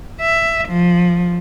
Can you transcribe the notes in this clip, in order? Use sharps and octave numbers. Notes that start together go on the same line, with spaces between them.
E5
F3